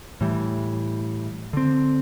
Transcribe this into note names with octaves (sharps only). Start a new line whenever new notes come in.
A2 E3 G3
D3 C4